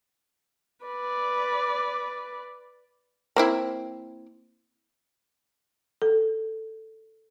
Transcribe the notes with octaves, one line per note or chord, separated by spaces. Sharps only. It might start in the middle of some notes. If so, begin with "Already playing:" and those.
B4 D5
A#3 C4 E4
A4